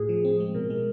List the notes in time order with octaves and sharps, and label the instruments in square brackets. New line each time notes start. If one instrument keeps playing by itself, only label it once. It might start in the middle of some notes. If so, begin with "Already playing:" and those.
Already playing: [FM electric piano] A2 [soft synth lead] G#4
[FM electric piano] F3
C4
G#3
[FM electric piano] B2 [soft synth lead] A#4
[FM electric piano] G#3